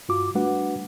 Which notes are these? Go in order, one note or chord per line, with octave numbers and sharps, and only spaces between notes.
G2 F4 F#4 D6
G3 A3 D4 F#4 B4 F#5